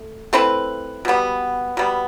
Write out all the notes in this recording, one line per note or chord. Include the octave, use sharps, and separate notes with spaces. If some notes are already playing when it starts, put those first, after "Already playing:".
Already playing: A3
A3 C4 E4 B4
B2 G3 B3
B2 G3 B3